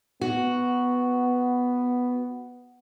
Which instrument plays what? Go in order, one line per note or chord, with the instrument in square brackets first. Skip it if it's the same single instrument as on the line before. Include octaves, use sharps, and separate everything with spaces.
[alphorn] B3 [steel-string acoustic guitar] F#4